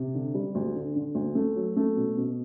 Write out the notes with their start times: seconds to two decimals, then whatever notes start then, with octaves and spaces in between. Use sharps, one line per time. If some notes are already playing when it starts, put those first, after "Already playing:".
Already playing: C3
0.15 D3
0.34 G3
0.55 D2
0.75 D3
0.96 D3
1.15 D2
1.35 A3
1.56 F#3
1.77 A3
1.97 B2
2.17 B2